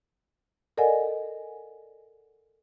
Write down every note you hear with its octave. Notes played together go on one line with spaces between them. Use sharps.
A4 A#4 D5 D#5 F#5 G#5